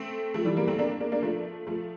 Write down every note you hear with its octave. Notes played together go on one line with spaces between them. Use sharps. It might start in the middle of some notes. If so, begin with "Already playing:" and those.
Already playing: A3 C4
F3 A3
E3 G3
G3 A#3
A3 C4
A#3 D4
A#3 D4
A#3 D4
F3 A3
F3 A3